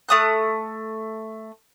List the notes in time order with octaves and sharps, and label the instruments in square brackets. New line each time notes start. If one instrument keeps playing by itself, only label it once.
[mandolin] A3 D#6 F#6